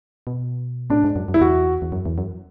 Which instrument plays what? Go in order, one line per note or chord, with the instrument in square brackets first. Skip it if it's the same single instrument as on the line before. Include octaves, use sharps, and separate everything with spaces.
[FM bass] B2
[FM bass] A2 [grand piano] D4
[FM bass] G#2
F#2
F#2
[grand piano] E4
[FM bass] E2 [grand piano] F#4
[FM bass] E2
F#2
E2
F#2